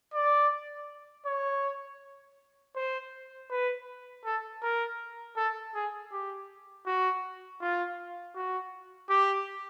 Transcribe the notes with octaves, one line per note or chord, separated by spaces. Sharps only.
D5
C#5
C5
B4
A4
A#4
A4
G#4
G4
F#4
F4
F#4
G4